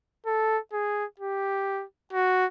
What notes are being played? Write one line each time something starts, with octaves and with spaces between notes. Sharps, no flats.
A4
G#4
G4
F#4